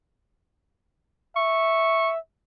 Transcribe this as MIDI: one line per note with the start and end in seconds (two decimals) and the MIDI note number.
1.36 2.18 76
1.36 2.10 85